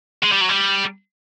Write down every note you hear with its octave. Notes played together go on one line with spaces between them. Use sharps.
G#3
G3
F#3
G3